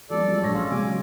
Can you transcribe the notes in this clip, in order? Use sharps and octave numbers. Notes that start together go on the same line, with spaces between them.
F3 G3 A4 D5
F#3 G#3
A#1 G#3 C#5 A#6
C#4 F5 C6 E6
C#3 F#3 G#3 G#5 D6